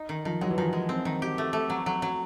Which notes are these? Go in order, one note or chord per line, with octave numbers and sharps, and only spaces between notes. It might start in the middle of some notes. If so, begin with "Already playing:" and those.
Already playing: D#4
D#3
D#3 F3
F#3 G#3
E3
D#3 F3
G#3
C4
D#3
G4
A3
A3
F#3
F#3
F#3